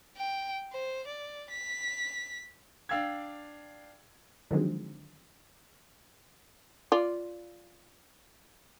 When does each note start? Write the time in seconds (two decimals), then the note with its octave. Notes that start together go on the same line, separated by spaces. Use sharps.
0.17 G5
0.72 C5
1.08 D5
1.50 B6
2.89 D4 D5 F5 G5 E6 G#6
4.51 D3 D#3 F3 F#3 G#3 C4
6.92 F4 D5